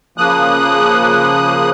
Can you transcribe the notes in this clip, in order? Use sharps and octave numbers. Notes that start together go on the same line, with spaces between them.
C#3 F3 A#3 D#6 F#6